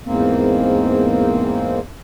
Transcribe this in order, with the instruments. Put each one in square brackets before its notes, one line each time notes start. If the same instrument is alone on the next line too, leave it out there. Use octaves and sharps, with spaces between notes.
[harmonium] E2 G#2 A#3 C4